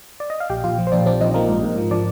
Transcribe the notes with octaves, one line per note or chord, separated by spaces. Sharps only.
D5
D#5
F5
A#1 G4 G5
A#1 F4 F5
F3
C5
A#1 D4 D5
C4 D4 D5
F3 D#4 D#5
F3 A#3 A#4
G#2
G#2
F3
F3 D4 D5